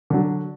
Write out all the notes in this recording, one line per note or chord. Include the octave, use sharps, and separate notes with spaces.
D3 F#3